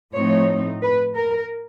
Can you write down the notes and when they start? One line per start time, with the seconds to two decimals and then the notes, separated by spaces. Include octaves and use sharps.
0.13 A2 F3 A3 C4 D#4 C#5
0.82 B4
1.16 A#4